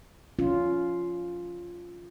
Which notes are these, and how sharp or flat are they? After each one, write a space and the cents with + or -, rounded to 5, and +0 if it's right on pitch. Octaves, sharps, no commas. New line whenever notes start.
C#4 +25 F4 +0